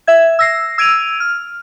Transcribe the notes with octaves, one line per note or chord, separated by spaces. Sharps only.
E5 G#6
E6 A#6 C7
E6 G#6 D7 D#7 F7
F6